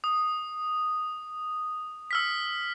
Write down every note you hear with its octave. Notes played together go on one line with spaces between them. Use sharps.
D#6
E6 F6 B6